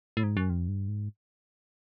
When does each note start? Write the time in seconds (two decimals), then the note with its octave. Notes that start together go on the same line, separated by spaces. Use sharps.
0.17 A2
0.23 G#2
0.37 F#2
0.50 F2
0.68 G2
0.88 G#2